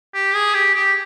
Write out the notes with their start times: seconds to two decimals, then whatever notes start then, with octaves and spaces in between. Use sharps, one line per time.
0.14 G4
0.35 G#4
0.54 G4
0.75 G4